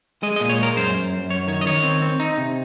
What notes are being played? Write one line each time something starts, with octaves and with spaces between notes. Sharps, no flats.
G#3 D#5
D#5
A#2
C#5
G#3 A#4
F#2 C5
F#2
F#2
F#2 C#5
D#3 C#5
D#5
D#3 C#5
C4
C4
D#4
C3